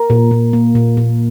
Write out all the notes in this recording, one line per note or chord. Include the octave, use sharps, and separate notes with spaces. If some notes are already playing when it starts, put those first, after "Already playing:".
Already playing: A#4
A#2
A#2
A#3
A#2
A#2